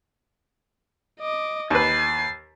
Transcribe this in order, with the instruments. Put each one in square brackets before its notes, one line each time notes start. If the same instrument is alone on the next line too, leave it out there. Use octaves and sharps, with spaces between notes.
[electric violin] D#5 D6
[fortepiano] D#2 B4 [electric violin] A6 C7